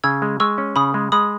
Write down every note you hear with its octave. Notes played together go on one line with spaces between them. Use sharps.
C#3 E6 G#6
G#3
G#3 C#6 E6
C#4
C#3 B5 D#6
G#3
G#3 B5 D#6